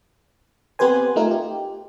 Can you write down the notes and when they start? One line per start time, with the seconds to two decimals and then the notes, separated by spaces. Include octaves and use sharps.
0.79 B3 C4 G4 B4 C5 G#5
1.16 A3 D#4 F4 A#4
1.31 G4